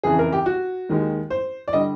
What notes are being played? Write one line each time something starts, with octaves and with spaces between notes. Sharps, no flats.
F2 C#3 E3 G#4
A#4
G4
F#4
D#2 D#3 G#3
C5
D5
D3 G3 D#5